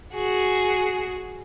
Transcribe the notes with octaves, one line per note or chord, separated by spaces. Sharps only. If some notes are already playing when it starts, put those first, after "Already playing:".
F#4 G#4